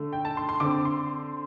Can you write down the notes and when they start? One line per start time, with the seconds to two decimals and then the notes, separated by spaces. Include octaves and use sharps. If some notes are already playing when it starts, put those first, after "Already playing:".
Already playing: D3 A3
0.13 G5
0.25 A5
0.37 C6
0.49 C6
0.60 D3 C4 D6
0.85 C6